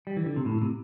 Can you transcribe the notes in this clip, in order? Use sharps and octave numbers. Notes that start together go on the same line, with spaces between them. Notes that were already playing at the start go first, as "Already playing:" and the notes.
G3
E3
D3
C3
A2
C3